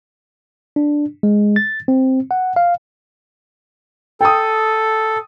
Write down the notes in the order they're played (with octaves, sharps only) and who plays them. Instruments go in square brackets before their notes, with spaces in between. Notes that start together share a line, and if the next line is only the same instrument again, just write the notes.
[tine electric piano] D4
G#3
A6
C4
F#5
F5
[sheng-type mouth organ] A4 [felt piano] G5 D#6